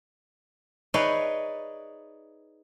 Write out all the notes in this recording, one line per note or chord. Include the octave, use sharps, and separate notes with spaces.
D#4 G#4 B4 C#5 D5 E5